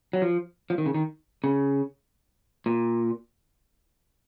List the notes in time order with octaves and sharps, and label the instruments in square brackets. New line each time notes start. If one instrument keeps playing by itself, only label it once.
[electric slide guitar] F#3
F3
F3
D#3
C#3
D#3
C#3
A#2